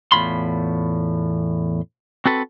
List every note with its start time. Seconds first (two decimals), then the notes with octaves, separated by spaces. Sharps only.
0.12 E2 A2 F4 B5 C6
2.25 C4 F#4 A4 B4